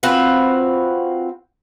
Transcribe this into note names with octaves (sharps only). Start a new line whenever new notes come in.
C4 F4 F#4 B4